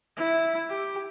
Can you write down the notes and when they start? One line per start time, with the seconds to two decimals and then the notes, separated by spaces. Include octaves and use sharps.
0.17 E4
0.69 G4